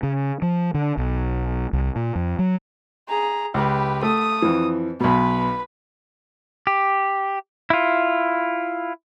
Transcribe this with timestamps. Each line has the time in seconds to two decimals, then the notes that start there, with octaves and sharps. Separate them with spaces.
0.03 C#3
0.42 F3
0.74 D3
0.97 B1
1.73 C2
1.96 A#2
2.16 F2
2.39 F#3
3.09 G#4 A#5
3.54 C#2 G4 B4
4.03 A3 D#6
4.42 F2 E3
5.00 B1 B2 B4 B5
6.67 G4
7.70 E4 F4